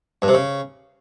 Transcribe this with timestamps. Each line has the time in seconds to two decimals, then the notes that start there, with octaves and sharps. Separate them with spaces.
0.22 G2
0.28 C3
0.34 C#3